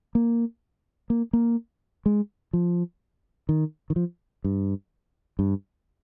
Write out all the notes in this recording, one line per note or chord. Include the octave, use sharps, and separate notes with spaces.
A#3
A#3
A#3
G#3
F3
D#3
D#3
F3
G2
G2